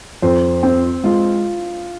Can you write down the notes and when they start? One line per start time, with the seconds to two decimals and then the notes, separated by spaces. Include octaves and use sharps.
0.22 F2 C5
0.63 C4
1.04 G#3 F4